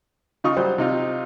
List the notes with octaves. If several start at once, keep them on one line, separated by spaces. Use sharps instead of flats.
C#3 D#4 F4 C#6 D#6
F#3 G3 C5
C3 D#4 F4